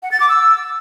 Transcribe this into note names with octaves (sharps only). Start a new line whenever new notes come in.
F#5
A6
D6
E6